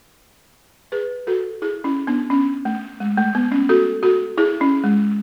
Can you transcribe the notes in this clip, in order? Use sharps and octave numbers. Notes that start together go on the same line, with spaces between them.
G#4 B4
F#4 A4
E4 G#4
C#4 E4
B3 D4
C#4
A3
G#3
A3
B3
C#4
F#4 A4
F#4 A4
E4 G#4
C#4 E4
G#3